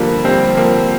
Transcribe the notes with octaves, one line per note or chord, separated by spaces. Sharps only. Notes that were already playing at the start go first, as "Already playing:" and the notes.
Already playing: D3 F3 G3 A#3
G3 C4
F3 A#3